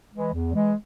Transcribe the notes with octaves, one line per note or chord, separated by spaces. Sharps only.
E3 G#3
E2
E3 G#3